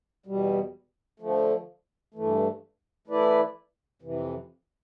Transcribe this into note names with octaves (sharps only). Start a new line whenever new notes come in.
E2 B2 G3
D3 F3 A3
G2 E3 A3
E3 A3 E4 B4 D5
F2 C3 E3